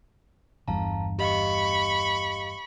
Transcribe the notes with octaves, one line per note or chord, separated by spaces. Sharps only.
G1 E2 G2 F5 A5 A#5
G4 D#5 F5 B5 C#6